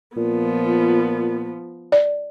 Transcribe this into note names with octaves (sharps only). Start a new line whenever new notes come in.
A#2 F3 B3
D5